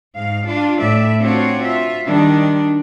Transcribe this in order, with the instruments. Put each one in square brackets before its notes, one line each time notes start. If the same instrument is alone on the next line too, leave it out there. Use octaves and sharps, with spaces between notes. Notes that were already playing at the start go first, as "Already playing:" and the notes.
[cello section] G#2 F5
D4 F4
A2 D5 E5
C4 D4 F4 F#4 C#5
F4 E5
D#3 G3 D4